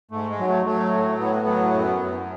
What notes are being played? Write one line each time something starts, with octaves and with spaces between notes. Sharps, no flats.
G#2 A3
G#3
F#3
A3
F#3 A3
A2
A2 B3
F#3
F#2
F#2